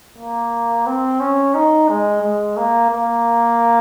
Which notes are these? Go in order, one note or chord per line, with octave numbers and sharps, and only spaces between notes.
A#3
C4
C#4
D#4
G#3
G#3
A#3
A#3